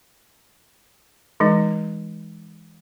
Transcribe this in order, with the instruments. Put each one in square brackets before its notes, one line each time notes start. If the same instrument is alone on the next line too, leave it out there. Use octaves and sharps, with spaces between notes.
[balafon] E3 G#3 D#4